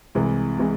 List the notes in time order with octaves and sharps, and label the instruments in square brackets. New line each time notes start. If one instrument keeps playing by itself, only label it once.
[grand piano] C2 C3 E3 G#3
C3 E3 G#3